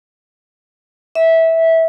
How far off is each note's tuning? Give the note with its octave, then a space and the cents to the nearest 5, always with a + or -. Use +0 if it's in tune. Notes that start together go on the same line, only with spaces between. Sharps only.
E5 -15